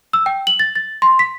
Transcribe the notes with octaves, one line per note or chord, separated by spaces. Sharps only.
E6
G5
F#7
A6
A6
C6
B6